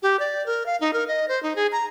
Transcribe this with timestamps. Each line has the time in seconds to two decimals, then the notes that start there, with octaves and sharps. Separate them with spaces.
0.03 G4
0.20 D5
0.46 A#4
0.66 F5
0.81 D#4
0.93 A#4
1.08 D#5
1.28 C5
1.43 D#4
1.56 G#4
1.72 A#5